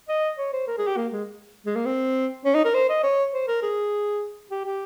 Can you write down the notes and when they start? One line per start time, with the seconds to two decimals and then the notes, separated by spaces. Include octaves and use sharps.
0.09 D#5
0.38 C#5
0.53 C5
0.67 A#4
0.78 G#4
0.87 G4
0.97 A#3
1.12 G#3
1.66 G#3
1.76 A#3
1.86 C4
2.45 C#4
2.55 D#4
2.65 A#4
2.74 C5
2.89 D#5
3.03 C#5
3.34 C5
3.48 A#4
3.62 G#4
4.51 G4
4.66 G4